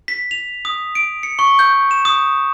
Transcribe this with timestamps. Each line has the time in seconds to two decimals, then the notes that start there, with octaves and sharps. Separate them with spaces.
0.08 B6
0.31 F7
0.65 D#6
0.95 D7
1.23 C#7
1.39 C#6
1.59 G6
1.91 E7
2.05 D#6